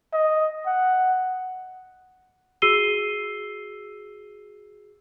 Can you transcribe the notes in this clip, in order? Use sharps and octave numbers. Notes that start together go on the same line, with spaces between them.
D#5
F#5
F#4 G#4 E6 C7 D#7 G7